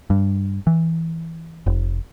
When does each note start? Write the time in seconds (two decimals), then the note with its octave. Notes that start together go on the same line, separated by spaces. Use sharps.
0.10 G2
0.67 E3
1.66 F1